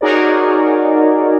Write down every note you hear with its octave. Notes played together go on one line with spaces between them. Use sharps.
D#4 F#4 G#4 A#4 C#5 D5